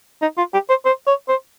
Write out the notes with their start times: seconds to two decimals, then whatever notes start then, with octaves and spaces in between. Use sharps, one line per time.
0.22 D#4
0.37 F4
0.53 G4
0.69 C5
0.85 C5
1.07 C#5
1.28 C5